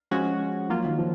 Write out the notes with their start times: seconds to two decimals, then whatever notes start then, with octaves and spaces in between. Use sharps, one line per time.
0.11 F3 G#3 C#4 F#4
0.69 F3 F#3 A#3 F4
0.85 D#3
0.98 F3